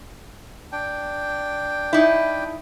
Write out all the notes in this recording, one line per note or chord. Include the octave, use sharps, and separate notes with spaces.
D4 G5
D#4 E4